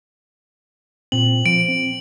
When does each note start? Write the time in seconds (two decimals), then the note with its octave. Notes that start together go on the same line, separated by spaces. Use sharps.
1.12 A#2 C4 F#7
1.46 F3 D7
1.69 C4